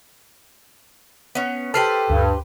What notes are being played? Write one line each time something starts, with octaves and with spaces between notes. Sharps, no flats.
B3 C#4
G4 A4 B4 C5 A5 F6 C7
D2 G2